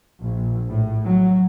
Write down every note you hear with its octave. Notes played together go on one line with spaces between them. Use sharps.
A#1
A2
F#3